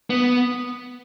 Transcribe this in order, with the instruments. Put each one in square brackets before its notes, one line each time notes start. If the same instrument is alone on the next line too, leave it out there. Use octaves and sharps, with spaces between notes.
[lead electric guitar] B3